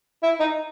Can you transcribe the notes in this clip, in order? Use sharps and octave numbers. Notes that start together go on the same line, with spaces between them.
E4
D#4